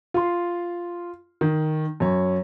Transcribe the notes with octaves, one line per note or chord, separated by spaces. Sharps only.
F4 C6
D#3
F#2 C#5